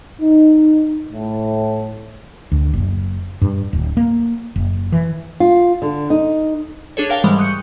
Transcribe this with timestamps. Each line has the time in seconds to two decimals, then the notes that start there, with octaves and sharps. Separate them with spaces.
0.22 D#4
1.12 A2
2.52 D2
2.73 F#1
3.42 G2
3.73 D1
3.97 A#3
4.56 F#1
4.92 E3
5.40 F4
5.82 D3
6.10 D#4
6.97 D4 G#4 A4 C#5
7.09 D4 A#4 F5 G5 A5
7.24 G#2 E3 G3 G#3
7.38 C#6 D#6 F#6 G6 C#7